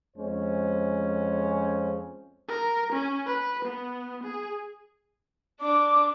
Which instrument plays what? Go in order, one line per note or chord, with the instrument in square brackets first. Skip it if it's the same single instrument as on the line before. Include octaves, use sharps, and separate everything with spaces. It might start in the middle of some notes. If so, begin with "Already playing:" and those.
[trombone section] F2 G#3 C#4 C5
[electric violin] A#4
C#4
B4
B3
G#4
[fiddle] D4 [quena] D6